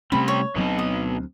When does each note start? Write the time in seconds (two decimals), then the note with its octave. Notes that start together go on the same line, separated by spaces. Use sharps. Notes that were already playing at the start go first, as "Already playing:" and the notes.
0.12 C3 G3 A3 C4 C#4 B5
0.28 C#5
0.56 D2 B2 F#3 C4 D#4
0.79 D#6